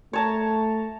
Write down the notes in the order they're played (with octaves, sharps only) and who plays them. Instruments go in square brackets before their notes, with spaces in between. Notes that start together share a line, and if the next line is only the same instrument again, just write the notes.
[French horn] A3 [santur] C#5 A5 A#5